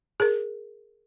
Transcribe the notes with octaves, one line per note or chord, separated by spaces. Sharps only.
G#4 A#4